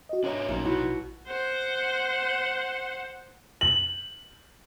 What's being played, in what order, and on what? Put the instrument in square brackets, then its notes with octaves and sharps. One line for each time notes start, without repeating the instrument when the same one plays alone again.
[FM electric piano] F#4 D#5
[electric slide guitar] D4 A#4 E5 [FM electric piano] F#4 C#5 A#5
[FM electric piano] A#1 [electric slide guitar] F#3 D#4 [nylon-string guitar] A#3 C#4
[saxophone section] B2 F#4 [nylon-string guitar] E4
[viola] C5 F#5
[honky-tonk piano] F#7